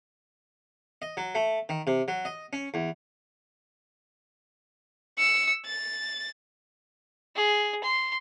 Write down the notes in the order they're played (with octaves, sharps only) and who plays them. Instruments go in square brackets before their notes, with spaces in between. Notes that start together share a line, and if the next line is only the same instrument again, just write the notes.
[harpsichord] D#5
F#3
A3
D#3
C3
F#3
D#5
C#4
E2
[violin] E6 C#7
A6
[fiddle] G#4
C6